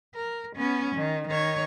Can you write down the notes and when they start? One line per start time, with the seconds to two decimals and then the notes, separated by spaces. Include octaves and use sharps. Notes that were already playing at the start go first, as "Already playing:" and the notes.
0.15 A#4
0.57 B3 C#4
0.96 D#3
1.28 D#3 C#5